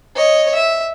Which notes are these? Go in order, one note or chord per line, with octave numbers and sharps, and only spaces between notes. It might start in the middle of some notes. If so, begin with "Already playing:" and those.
C#5 D#5
E5